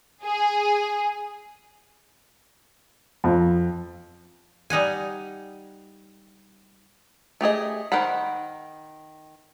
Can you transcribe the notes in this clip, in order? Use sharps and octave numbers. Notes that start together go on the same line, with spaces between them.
G#4
F2
G3 D#4 F#5 G#5
A3 G4 G#4 D#5
D#3 A#4 C5 F#5 B5